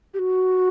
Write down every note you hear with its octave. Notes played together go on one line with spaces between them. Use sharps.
G4
F#4